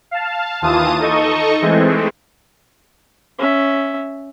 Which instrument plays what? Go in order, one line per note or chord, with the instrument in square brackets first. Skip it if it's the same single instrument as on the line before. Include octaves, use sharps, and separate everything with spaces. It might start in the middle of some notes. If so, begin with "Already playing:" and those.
[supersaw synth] F5 A5
D#2 E3 F4 A5 D#6 D#7
D#4 A4 D#5 C#6
E3 G#3 A3 C4
[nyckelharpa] C#4 E5